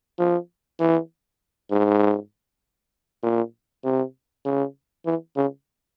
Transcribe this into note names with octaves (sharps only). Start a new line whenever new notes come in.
F3
E3
G#2
A#2
C3
C#3
E3
C#3